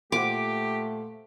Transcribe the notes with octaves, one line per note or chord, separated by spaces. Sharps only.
A#2 A3 G4 C5 F#5 D6